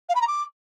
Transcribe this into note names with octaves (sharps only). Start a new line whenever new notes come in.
F5
B5
A#5
D6